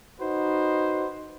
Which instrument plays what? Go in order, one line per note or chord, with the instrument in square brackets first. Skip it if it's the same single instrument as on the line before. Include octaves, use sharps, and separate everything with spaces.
[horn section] D#4 F#4 B4 C5 D#5